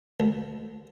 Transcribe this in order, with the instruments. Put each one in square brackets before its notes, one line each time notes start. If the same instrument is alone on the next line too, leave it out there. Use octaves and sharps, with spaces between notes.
[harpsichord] D2